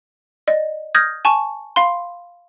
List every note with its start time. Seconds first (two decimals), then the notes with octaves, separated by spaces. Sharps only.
0.48 D5 D#5
0.95 D#6 F6 G6 G#6 A#6
1.25 G#5 A5 C#6
1.76 F5 B5 C6